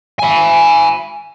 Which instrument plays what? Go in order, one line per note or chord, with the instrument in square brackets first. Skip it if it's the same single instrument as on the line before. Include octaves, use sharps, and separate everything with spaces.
[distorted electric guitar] G#5 B5